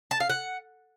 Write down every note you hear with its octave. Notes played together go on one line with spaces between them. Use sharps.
A5
F5
F#5